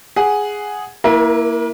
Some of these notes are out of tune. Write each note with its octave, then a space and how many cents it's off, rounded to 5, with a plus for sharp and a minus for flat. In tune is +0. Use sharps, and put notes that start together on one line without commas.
G#4 +0 F#5 +0
A#3 +0 E4 +0 A#4 +45